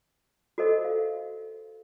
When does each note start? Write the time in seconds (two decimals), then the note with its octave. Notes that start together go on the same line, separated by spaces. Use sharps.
0.58 F#4 A4 A#4 C5 D#5
0.85 F5